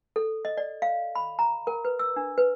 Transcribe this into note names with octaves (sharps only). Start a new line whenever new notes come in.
A4
D#5
D5
F5
B5
A#5
A#4
B4
E6
D4
B4